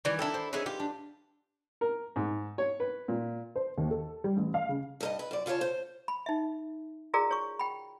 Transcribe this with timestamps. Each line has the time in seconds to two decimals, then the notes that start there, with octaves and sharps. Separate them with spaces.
0.05 D#3 E3 G3
0.19 D4 E4 A4 A#4 G5
0.34 C5
0.53 C#4 D#4 E4 G#4 B4 E5
0.66 F4 G4
0.79 D4
1.81 A#4
2.16 G#2
2.58 C#5
2.80 B4
3.08 A#2
3.56 C5
3.78 D#2
3.91 A4
4.24 G3
4.37 A1
4.54 F5
4.69 C#3
5.00 G2 A#4 D#5
5.19 B4
5.31 F#2 D5
5.46 C#3 F4 G4 C#5 A5
5.61 C5
6.08 B5
6.26 D#4 E5
7.14 F4 F#4 G#4 A#4 D5 A#5
7.31 C#5 C#6
7.59 G5 B5